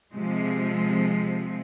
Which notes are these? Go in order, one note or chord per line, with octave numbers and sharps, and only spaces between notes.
C3 F3 G#3